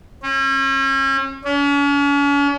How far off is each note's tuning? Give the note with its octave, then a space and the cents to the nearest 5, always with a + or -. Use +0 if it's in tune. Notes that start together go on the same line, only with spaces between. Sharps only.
C#4 -40
C#4 +40